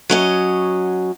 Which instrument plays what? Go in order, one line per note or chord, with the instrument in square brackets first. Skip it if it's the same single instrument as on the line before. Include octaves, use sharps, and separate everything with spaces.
[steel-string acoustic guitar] F#3 C#4 D#5